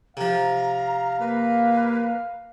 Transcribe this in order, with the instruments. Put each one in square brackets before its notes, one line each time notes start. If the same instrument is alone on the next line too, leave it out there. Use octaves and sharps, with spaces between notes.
[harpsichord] C3 F3 [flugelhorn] F5 [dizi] A#5
[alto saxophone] A#3 [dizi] B4